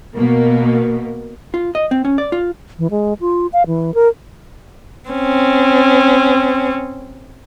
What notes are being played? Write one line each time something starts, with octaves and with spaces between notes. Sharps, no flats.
B2 A#3
F4
D#5
C4
C#4
D5
F4
E3
G#3
F4
F5
E3
A#4
C4 C#4